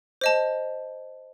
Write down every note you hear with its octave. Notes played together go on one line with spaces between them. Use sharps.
C5 D#5 A5